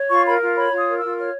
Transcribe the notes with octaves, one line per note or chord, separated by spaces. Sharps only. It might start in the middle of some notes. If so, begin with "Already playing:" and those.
Already playing: C#5
F4 C#6
A#4 B5
F4
C#5 B5
F4 D#6
A#4
E6
F4
C#5 F6